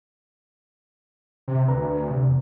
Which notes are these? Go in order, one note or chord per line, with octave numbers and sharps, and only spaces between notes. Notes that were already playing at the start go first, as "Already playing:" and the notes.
C3
D2 B4 A#5
C3
E2